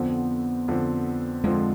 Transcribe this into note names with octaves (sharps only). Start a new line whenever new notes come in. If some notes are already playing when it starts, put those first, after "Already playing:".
Already playing: F2 D3 F3 B3 C4
F2 D3 F3 C4
F2 D3 F3 G#3 C4